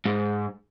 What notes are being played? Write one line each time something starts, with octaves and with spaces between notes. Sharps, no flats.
G#2